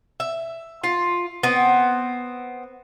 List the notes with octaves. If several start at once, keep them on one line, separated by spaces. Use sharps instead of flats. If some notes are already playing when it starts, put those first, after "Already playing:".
E5
F4
B3 C4